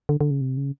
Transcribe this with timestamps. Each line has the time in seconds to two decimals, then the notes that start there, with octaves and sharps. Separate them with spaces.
0.09 D3
0.21 D3
0.31 C#3
0.41 C3
0.57 C#3